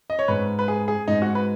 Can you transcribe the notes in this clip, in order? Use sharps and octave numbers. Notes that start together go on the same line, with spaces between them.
D#5
C#5
G#2 G#3 B4
B4
G#4
G#4
G#2 G#3 D#4
F#4
B4